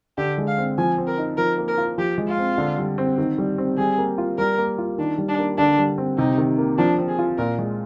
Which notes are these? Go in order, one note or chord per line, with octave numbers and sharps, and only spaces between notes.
D3 G4
G#3
F5
C4
F3 G#5
C4
A#4
D#4
F3 A#4
A#3
A#4
F4
F3 G4
G#3
F4
C4
D3
G3
C4
D#3
G3
C4
G3 G#4
A#3
F4
G3 A#4
A#3
F4
D#3 D4
G3
D4
A#3
D3 D4
G3
C4
C3 D#4
D#3
A#3
F3 D4
C4
G#4
F4
A#2 A#4
G#3